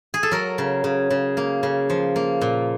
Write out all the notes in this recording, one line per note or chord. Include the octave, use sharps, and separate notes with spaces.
G#4
A4
F#3 A#4
C#3
C#3
C#3
A#3
C#3
F3
A#3
A#2